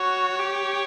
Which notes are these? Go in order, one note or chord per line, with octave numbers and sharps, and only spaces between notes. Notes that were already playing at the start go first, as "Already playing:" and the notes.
Already playing: F#4 C#5
G4